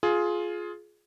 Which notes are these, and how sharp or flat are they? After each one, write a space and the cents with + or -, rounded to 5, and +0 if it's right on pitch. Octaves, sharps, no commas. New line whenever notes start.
F4 +5 G#4 +15